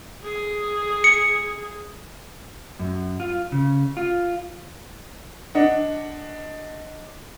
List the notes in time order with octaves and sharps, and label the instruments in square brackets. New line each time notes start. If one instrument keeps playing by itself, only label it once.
[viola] G#4
[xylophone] C#7
[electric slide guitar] F#2
F4
C#3
F4
[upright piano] D4 D#5 F#5